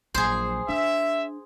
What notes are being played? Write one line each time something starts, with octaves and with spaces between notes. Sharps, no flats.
A#1 F#3 G#4 C5
D4 E5